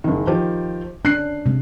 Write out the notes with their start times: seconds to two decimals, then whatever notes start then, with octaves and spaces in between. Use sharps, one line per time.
0.04 F#1 D#3
0.27 D#3 F3 G4
1.05 C#4 D4 F#6 C7
1.46 C3 G#3